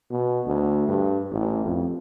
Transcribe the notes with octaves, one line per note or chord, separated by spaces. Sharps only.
B2
D2
G2
A1
F2